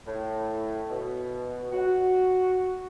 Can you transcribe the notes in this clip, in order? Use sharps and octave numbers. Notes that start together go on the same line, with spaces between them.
A2
B2
F#4